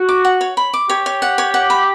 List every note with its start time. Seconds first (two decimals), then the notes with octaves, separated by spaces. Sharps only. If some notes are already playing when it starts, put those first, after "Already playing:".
Already playing: F#4
0.09 D6
0.25 F#5
0.41 C#5
0.57 B5
0.74 D6
0.90 G4 C#5
1.06 C#5
1.22 F#5
1.38 C#5
1.54 F#5
1.70 B5